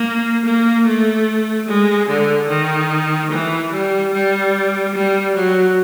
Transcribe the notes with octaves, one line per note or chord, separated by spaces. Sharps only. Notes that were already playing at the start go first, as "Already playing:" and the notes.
Already playing: A#3
A#3
A3
G#3
D3
D#3
E3
G3
G3
G3
F#3